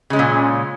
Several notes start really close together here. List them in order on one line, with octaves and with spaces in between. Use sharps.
C#3 G#3 C#4 A#2